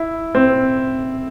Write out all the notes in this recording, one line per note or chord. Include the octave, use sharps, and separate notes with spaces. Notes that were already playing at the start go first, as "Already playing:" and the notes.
Already playing: E4
C4